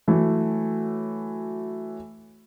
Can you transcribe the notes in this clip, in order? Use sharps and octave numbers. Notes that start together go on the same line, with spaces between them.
E3 F#3 A3